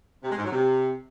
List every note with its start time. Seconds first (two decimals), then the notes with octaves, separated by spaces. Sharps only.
0.23 C3
0.30 G#3
0.37 G#2
0.44 F#3
0.51 C3